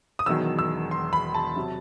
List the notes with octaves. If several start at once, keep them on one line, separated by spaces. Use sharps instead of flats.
D#6
E1 E2 D#3 F#3 E6
E6
C6
B5
A5
C3 F#3